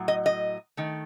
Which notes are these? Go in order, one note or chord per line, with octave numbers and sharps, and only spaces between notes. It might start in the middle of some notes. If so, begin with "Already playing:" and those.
Already playing: A2 F#3
D#5
D#5
D#3 A3